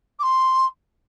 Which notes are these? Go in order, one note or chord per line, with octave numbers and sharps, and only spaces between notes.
D6
C6